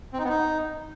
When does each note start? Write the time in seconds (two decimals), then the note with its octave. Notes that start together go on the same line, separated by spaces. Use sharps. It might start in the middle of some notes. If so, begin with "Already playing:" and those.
0.13 C4
0.19 D#4
0.24 B3
0.29 D#4